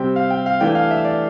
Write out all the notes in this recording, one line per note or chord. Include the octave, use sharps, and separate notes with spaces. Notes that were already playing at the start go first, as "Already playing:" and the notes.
Already playing: C3 G3 C4 G5
F5
G5
F5
E3 A3 D4 G5
F5
E5
D5